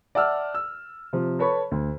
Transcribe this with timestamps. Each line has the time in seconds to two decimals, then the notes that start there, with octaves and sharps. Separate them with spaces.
0.15 D5 E5 F#5 A5 E6 F6
0.55 E6
1.13 C3 F3
1.39 A4 B4 C#5 A5 B5 C#6
1.71 D2